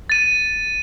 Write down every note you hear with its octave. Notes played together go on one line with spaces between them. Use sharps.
A6 D#7